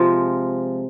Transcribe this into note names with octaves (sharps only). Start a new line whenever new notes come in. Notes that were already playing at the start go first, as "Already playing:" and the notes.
Already playing: C3 F3 G#3 F4